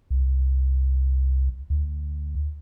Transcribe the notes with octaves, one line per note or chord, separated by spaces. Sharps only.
C2
D2